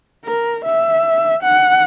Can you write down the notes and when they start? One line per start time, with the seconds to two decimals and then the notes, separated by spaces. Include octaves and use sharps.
0.25 A#4
0.64 E5
1.44 F#5